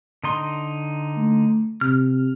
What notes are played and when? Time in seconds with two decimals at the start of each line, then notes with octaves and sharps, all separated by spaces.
0.23 D3 D#4 C6
1.17 A3
1.81 C3 F6